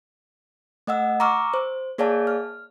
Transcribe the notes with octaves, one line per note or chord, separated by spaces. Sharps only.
A3 D#5 F#5 E6
A#5 C#6 D6 E6 F6
C5
A#3 G#4 C#5 D5 F5 A5
F6